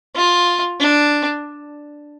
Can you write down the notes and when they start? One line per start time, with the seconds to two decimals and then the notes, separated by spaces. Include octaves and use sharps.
0.15 F4
0.80 D4